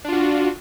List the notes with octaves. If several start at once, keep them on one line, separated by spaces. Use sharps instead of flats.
D4 F4 F#4